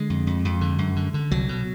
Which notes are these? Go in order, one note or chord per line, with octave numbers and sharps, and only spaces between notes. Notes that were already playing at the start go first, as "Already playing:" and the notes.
Already playing: D3 G#3
F2
F2
F2
D3
F#2
D3
D3
C2 F#3
B2